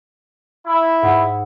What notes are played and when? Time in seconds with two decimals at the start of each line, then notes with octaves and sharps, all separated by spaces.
0.65 E4
1.02 G#2 F#5 D#6